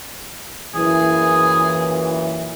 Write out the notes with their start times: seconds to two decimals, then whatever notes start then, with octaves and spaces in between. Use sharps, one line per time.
0.75 F#2 A#2 E3 G#4